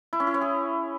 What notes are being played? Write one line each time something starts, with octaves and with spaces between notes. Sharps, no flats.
E4
C#4
E4
C#5
G#4